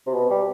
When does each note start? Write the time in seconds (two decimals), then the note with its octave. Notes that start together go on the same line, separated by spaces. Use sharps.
0.06 C3
0.14 B2
0.30 G3